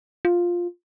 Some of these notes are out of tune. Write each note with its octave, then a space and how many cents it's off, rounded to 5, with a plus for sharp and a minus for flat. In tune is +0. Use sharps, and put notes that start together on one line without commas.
F4 +5